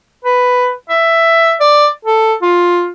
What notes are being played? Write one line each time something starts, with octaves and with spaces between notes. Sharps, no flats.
B4
E5
D5
A4
F4